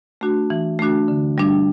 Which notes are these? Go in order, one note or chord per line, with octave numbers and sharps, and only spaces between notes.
A3 D4 F#4
E3
A3 D4 F#4
D3
G3 D4